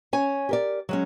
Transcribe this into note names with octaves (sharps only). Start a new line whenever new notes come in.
C#4 C#5 G#5
G4 A#4 D5
F#3 G#3 C#4